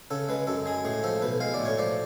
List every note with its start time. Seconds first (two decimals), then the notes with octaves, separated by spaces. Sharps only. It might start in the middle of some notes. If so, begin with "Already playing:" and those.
0.11 C#3 A4
0.29 G#3 B4
0.47 F#2 A4
0.66 G#3 G#4
0.85 A2 G#4
1.03 F3 A4
1.22 B1 B4
1.40 G#3 F5
1.54 D5
1.59 A2
1.65 C#5
1.78 F3 D5